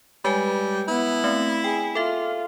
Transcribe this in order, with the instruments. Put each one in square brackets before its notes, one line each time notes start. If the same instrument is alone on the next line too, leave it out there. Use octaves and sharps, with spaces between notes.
[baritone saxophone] G3 [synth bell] G#3 B4 G#5
[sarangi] B3 [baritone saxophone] E4
[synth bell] A3 C4
[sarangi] G#4 [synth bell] G5
[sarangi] F4 [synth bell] A4 E5